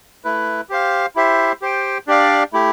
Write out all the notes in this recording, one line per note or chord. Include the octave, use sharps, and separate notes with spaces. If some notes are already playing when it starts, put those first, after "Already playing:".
A3 E4 B4
G4 C5 F5
E4 G4 C5 E5
G4 C5 G5
D4 G4 D5 F5
A3 E4 G4